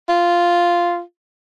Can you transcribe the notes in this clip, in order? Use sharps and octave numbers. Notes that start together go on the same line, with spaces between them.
F4